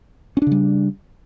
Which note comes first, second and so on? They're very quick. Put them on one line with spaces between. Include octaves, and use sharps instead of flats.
C#4 D4 C#3 G3